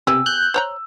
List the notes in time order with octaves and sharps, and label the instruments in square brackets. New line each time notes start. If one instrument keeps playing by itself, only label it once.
[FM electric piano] C3 [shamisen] B3 G4 G#4 [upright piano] E6
[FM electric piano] F#6 G6
[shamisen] C5 C#5 A#5